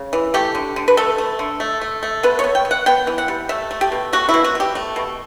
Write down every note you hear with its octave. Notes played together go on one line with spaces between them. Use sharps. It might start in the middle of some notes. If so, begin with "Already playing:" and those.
Already playing: C#3
E3
A3 G4
D3
D3
B4
A3 A4
A3
D3
A3
A3
A3
B3 B4
B3 C#5
G5
B3
F#5
B3 G5
E3
F#5
G3
A3 E5
A3
G4
B2
A3 F#4
E4
B2
F#4
B2 G4
A3
B2